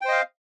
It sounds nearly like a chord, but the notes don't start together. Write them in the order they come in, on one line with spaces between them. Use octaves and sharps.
G5 C5 D#5 F5